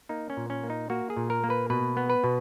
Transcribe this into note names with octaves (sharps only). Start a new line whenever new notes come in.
A#3 D#4
C#4
A#2
C#4
A#3
D#4
A#3 F#4
G#4
A#2
A#4
A#3
B4
B2 B4
B3
B4
B2